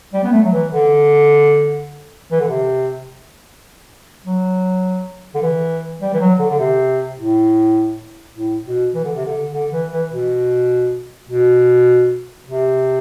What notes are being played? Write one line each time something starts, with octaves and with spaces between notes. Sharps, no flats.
G3
B3
A3
F#3
E3
D3
E3
D3
C3
F#3
D3
E3
G3
E3
F#3
D3
D3
C3
A2
A2
B2
E3
D3
C3
D3
D3
E3
E3
B2
B2
C3